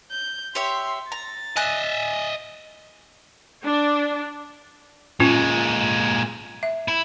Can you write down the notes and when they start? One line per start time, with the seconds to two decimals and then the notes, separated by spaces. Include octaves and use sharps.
0.11 G6
0.55 G4 C#5 E5 C6
1.12 A#5 A6
1.56 D#5 E5 G#5 F#6
3.65 D4
5.20 A#2 G#3 C#4 F4
6.63 E5
6.88 E4